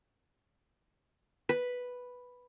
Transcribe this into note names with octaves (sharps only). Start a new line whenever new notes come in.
B4